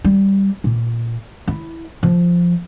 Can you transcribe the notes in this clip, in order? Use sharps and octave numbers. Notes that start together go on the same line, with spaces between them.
G3
A#2
E4
F3